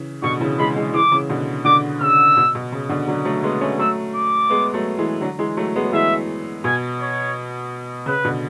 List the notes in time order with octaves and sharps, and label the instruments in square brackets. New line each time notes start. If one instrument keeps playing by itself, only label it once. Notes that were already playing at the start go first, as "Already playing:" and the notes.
Already playing: [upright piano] C#3 E3
[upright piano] B2 D3 [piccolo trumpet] C#6
[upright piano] C#3 E3
[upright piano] E3 G#3 [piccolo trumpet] B5
[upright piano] E3 G#3
[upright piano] E3 G#3 [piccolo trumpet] D6
[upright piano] C#3 E3
B2 D3
[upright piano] B2 D3 [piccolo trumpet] D6
[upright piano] C#3 [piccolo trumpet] E6
[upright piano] B2
B2
C#3
B2 D3
D3 F#3
F#3 A3
G#3 B3
A3 C#4
[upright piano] F#3 A3 [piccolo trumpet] E6
[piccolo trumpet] D6
[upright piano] G#3 B3
F#3 A3
E3 G#3
D3 F#3
E3 G#3
F#3 A3
G#3 B3
F#3
[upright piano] E3 G#3 [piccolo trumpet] E5
[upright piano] B2 [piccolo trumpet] G#5
[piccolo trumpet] C#5
[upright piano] C#3 [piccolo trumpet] B4
[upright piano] B2 D3